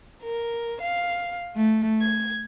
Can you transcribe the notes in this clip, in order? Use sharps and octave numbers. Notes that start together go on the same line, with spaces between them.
A#4
F5
A3
G#6